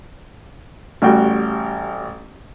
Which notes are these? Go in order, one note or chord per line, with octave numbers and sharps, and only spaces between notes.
A1 G3 F#4 G5